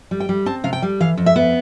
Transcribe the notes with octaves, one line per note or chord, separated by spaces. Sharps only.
G3
G5
G3
C4 A5
C3 F5
G5
G3
E3 F5
F2
E5
B3